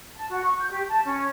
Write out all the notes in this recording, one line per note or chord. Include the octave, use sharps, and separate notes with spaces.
A5
F#4
C#6
G6
G4
A5
C#4